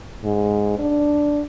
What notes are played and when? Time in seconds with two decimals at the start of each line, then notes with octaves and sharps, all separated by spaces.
0.24 G#2
0.79 D4